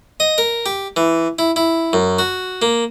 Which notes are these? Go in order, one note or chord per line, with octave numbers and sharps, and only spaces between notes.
D#5
A#4
G4
E3
E4
E4
F#2
F#4
A#3